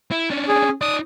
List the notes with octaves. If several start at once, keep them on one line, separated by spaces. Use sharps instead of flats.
E4
C#4 D4
G#4
D#4 D5 D#6